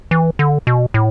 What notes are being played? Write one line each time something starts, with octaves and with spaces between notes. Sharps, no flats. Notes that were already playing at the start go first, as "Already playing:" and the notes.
E3
D3
B2
A2